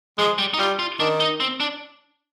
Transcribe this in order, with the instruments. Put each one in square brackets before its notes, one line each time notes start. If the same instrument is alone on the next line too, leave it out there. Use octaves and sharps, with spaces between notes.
[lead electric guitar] F3 [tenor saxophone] G#3
[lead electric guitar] G3
D#4
[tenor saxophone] G3 [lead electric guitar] F4
[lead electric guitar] F4
[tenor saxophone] D#3 [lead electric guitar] D4
[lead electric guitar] D#4
C4
D4